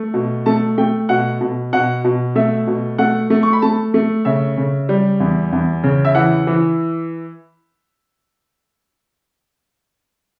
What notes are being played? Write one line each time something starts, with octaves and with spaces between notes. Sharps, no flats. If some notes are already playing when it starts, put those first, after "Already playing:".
Already playing: A3
B2
A3 A5
A3 G5
B2 F#5
B2
B2 F#5
B2
A3 E5
B2
A3 F#5
A3
C#6
B5
A3 A5
A3
C#3 E5
C#3
G3
E2
E2
C#3
E5
E3 F#5
E3